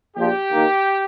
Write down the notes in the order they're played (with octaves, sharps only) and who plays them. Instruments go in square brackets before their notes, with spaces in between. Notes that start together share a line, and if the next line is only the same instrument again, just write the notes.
[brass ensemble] A#1 A#2 F3 G4
D#2 D#3 A#3